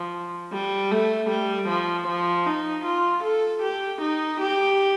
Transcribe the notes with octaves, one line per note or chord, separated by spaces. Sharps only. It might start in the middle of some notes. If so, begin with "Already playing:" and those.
Already playing: F3
G3
A3
G3
F3
F3
D#4
F4
A4
G4
D#4
G4